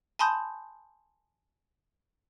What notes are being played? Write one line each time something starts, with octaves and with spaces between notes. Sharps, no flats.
G#5 A5 B5 C6 D#6 G6